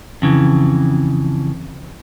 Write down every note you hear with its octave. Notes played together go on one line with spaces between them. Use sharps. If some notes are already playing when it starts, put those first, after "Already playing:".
F2 C#3 E3